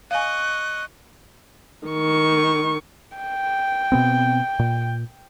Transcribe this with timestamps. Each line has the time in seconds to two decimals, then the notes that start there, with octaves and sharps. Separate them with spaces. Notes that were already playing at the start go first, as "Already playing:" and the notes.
0.11 D#5 F5 G#5 C#6 F#6
1.88 D#3 C#6
3.17 G5
3.92 B2 B3 C4
4.59 A#2